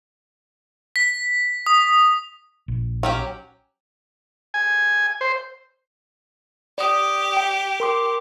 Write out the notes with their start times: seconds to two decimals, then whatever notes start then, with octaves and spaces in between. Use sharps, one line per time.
0.96 B6
1.66 D#6
2.68 A#1
3.03 F#3 C#4 G4
4.54 G#5
5.21 C5
6.78 G4 D5 D#6
7.37 G5
7.80 A#4 C6 D6